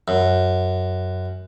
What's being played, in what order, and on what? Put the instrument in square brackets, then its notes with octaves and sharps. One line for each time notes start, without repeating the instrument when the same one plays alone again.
[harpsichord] F#2